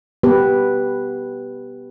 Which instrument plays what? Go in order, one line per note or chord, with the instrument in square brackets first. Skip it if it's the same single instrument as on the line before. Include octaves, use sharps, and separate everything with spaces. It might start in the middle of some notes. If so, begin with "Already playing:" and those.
[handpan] B3 G4 B4